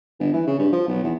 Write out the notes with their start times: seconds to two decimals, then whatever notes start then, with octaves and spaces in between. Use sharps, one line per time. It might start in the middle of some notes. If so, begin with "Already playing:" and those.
0.20 G1
0.33 E3
0.47 C#3
0.59 G2
0.72 F3
0.88 B1
1.04 E2